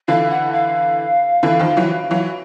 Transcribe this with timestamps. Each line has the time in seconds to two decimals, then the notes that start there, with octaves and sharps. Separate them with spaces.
0.08 D3 E3 F5
0.30 F#5
0.53 F5
1.43 D3 E3
1.59 D#3 F3
1.77 E3 F#3
2.11 E3 F#3